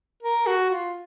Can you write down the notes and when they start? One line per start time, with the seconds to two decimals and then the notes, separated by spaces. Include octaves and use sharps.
0.23 A#4
0.47 F#4
0.70 F4